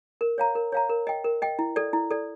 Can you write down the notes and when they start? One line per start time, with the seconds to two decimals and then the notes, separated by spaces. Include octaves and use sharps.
0.21 A#4
0.38 C#5 F5 A#5
0.55 A#4
0.72 C#5 F5 A#5
0.89 A#4
1.07 D#5 G5
1.24 A#4
1.42 D#5 G5
1.59 E4
1.76 A4 D5
1.93 E4
2.11 A4 D5